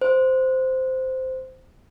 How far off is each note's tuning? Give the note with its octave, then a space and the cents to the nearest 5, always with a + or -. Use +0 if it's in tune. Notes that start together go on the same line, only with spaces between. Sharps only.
C5 -10